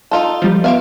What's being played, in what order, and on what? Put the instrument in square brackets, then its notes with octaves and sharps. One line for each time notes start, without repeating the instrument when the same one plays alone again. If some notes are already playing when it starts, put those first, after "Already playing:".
[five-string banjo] D#4 F4 A4
[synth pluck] F3 G3
[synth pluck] B3 D7 [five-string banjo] F4 E5 F5